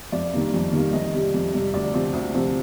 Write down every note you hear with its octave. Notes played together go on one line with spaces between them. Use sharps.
F2 D5
D#3 G3 A#3
F2
D#3 G3 A#3
F2 D#5
C3 G3
F2
C3 G3
D2 D5
C3 F3 C4
D2
C3 F3 C4